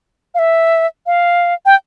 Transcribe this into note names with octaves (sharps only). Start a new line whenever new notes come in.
F5
E5
F5
G5